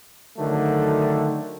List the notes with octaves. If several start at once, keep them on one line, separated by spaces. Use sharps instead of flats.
D3 D#3 F#3 A3